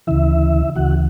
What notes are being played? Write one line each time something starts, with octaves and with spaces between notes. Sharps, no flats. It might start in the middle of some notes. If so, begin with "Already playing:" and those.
D2 C#3 E3 E4 E5
D2 C#3 E3 F#4 F#5